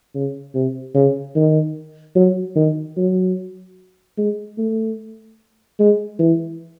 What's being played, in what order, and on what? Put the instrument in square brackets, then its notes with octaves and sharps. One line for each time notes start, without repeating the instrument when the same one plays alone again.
[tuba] C#3
C3
C#3
D#3
F#3
D#3
F#3
G#3
A3
G#3
E3